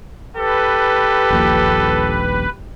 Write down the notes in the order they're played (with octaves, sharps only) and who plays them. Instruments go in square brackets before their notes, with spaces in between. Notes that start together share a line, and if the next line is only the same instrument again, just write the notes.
[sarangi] G4 [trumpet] A4 [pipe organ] B4
[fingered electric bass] D#1 A#1 A#2